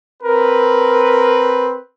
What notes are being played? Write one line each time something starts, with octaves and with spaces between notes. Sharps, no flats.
C4 A#4 B4